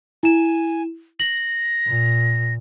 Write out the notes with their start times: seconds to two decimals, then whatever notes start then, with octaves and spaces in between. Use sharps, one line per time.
0.23 E4 G#5 E7
1.20 A#6 F#7
1.87 A#2